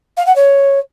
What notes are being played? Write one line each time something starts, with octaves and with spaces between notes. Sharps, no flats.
F5
F#5
C#5